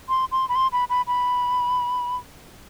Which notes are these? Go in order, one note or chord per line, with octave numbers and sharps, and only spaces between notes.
C6
C6
B5
C6
B5
B5
B5